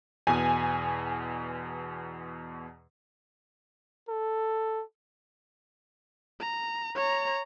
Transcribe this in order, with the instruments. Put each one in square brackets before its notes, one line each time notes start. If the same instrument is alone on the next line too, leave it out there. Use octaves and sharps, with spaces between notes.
[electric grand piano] E2 B2 [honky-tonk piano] G#5
[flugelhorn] A4
[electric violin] A#5
C#5 A#5